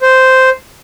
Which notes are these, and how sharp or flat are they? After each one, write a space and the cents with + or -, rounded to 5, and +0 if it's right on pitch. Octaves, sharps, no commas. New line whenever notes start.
C5 -5